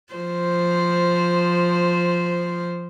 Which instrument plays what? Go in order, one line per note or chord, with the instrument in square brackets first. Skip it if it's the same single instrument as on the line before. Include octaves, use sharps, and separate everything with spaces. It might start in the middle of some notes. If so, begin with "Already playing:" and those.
[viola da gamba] F3 C5